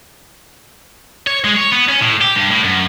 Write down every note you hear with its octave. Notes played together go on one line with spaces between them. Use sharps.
C#5
G#3
C#5
B3
C#4
A2
G4
G2
A2
F#2